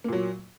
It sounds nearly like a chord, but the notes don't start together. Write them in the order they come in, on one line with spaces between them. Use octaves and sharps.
A#3 A#2 F#3